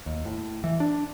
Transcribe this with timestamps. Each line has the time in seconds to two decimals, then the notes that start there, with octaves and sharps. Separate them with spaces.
0.06 D#2
0.25 A2
0.64 E3
0.80 D4